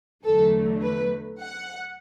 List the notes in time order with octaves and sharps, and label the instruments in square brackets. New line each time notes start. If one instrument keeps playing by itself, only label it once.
[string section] E2 D3 F#3 A3 A4
B4
F#5